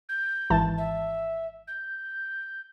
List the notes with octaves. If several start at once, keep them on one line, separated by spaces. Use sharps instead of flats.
G6
G#1 E3 A5
E5
G6